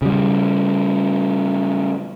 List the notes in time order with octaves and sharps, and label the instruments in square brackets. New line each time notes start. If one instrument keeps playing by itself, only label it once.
[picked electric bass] C#3 G3